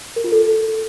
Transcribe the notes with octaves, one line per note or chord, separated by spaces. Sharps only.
A#4
F4
A4